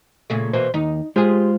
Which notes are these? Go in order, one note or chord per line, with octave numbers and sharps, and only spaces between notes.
A#2 C#3 A3
B2 E3 A#3 C5
D#2 D#4
G#3 F4 G4 G#4 C5